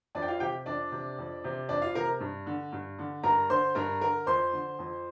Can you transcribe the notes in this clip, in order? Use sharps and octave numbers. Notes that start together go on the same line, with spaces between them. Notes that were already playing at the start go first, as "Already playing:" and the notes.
F2 D4 D5
G5
F4 F5
C3 G4 G5
F2 D4 D5
C3
F2
C3
F2 D4 D5
F4 F5
C3 A#4 A#5
G2
D3
G2
D3
G2 A#4 A#5
D3 C5 C6
G2 A#4 A#5
D3 A#4 A#5
F2 C5 C6
D3
F2